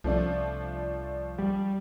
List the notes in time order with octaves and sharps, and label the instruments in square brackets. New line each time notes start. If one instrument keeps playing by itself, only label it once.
[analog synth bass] C2 [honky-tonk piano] F3 A3 D4
[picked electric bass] G3